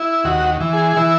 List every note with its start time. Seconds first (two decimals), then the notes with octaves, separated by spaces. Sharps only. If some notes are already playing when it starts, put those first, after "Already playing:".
Already playing: E4
0.24 D#2 F#4
0.60 E3
0.73 G#4
0.96 E3 E4